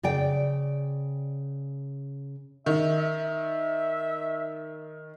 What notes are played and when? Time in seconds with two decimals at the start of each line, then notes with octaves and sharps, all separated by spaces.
0.03 C#3 D5 G5
2.66 D#3 E5
2.98 E5